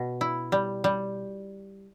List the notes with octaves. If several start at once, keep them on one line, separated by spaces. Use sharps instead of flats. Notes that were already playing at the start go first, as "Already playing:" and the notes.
Already playing: B2
E4
G3
G3